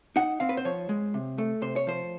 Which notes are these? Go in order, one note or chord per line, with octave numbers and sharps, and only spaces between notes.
D#4 F#5
C4 F5
B4
C5
F3 C#5
G#3
C3
A3
C3 C5
C#5
F3 C5